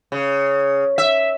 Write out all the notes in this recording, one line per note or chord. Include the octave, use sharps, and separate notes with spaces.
C#3
E5